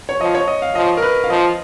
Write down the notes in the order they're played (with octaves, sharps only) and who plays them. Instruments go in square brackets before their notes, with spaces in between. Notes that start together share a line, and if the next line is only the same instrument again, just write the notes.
[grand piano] C#5
[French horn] F3 [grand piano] D#5
[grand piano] C#5
D#5
F5
[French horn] F3 [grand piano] D#5
[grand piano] A#4
B4
F5
[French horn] F3 [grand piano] D#5